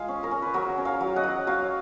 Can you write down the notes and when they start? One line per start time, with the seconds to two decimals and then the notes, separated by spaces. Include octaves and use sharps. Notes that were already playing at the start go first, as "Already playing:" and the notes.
Already playing: G#3 F4 G#4 F5
0.08 C#4
0.23 A#4 C#5
0.31 C#4
0.42 B4
0.54 F#3 A#4 C#5
0.78 C#4
0.85 C#5 F5
1.01 F#3
1.16 D#5 F#5
1.24 F#3
1.47 F#3 C#5 F5